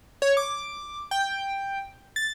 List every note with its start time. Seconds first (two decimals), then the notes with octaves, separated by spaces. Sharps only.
0.22 C#5
0.37 D6
1.11 G5
2.16 A6